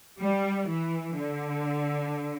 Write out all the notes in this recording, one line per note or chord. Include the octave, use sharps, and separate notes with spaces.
G3
E3
D3